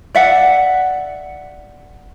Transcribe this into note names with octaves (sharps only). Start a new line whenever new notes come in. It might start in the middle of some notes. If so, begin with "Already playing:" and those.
D5 E5 F#5